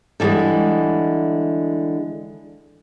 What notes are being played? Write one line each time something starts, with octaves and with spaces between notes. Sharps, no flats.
D3 E3 F3 G3 G#3